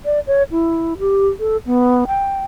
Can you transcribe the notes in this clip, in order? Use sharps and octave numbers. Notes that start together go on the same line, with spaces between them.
D5
C#5
E4
G4
A4
B3
G5